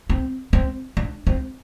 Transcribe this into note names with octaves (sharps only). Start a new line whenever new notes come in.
C4
C4
D4
C4